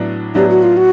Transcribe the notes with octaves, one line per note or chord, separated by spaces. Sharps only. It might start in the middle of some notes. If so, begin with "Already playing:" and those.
Already playing: A2 F#3 B3 D4
A2 F#3 B3 D4 G4
F#4
F4
F#4